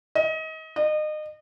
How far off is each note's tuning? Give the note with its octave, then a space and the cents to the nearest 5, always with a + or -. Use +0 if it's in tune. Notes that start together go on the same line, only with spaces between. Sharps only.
D#5 +30
D#5 -30